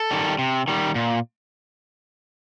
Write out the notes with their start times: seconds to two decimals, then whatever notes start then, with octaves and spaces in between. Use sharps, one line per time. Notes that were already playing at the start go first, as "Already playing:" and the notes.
Already playing: A4
0.11 D#3 G3
0.38 C3
0.68 D#3 G3
0.95 A#2